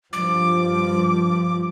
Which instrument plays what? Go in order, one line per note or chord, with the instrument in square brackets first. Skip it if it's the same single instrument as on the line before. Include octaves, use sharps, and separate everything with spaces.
[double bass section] G2 F3 [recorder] D6